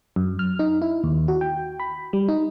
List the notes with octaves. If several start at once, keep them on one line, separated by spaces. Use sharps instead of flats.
F#2
F6
D#4
E4
D#2
F#4
G5
B5
G3
D#4